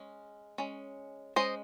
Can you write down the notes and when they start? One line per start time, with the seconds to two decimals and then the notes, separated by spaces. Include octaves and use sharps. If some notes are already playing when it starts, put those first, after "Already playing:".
Already playing: G#3 C#4
0.58 G#3 C#4
1.36 G#3 C#4 C5 D#5